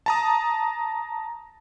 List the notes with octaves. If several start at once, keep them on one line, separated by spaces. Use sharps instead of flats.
A5 A#5 D#6